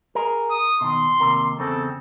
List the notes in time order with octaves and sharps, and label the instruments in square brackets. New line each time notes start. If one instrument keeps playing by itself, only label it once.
[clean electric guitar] G#4 A#4
[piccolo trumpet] D#6
[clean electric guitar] B2 D#3 [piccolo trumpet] C6
[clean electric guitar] D#2 C3 A#4
[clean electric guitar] E2 C#3 C4 [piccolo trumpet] A4